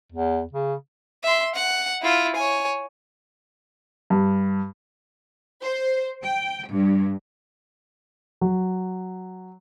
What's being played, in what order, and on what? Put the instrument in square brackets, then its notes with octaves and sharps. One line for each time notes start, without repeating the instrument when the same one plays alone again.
[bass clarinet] E2
C#3
[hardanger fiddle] E5 C6
F#5
E4 F4
C#5 G#5
[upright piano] G2
[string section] C5
G5
G2
[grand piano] F#3